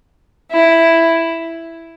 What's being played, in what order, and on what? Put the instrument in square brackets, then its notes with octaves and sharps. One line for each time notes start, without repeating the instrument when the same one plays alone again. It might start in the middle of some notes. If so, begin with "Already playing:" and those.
[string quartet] E4